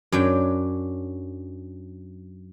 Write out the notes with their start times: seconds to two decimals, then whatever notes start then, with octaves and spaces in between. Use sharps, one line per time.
0.12 F#2 F#3 D4 G5